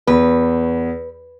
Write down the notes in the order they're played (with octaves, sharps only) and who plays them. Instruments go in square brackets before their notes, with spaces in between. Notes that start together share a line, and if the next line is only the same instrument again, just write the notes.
[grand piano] E2 [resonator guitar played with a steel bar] B4